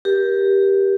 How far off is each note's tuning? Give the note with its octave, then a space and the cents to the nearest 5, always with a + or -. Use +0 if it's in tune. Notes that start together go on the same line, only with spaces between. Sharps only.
G4 +0 A#4 +30